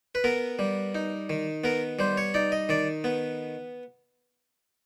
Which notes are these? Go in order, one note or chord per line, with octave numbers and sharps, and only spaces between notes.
B4
B3 A#4
G3
D#4
D#3
B3 A#4
G3 C5
C#5
D#4 D5
D#5
D#3 D5
B3